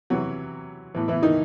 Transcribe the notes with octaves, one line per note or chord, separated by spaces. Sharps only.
C3 E3 F#3 F#4
A2 E3
E3 E4
D#3 D#4